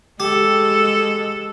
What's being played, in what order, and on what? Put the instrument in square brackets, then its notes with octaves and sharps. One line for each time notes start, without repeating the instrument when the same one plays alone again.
[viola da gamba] G#3 A4 [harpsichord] G4